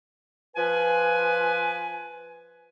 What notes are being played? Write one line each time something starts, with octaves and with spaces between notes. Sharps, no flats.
F3 B4 G#5